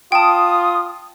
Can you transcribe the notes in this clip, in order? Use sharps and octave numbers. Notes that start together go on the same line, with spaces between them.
F4 G5 A5 D#6